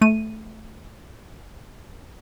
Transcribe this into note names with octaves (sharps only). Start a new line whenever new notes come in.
A3 D#7